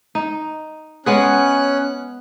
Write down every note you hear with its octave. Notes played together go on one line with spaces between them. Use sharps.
D#4
G#3 B3 C#4 G#4 F#6